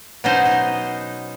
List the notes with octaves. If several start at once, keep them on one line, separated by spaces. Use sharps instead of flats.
B2 F#3 B3 C#4 D#4 C5
D#4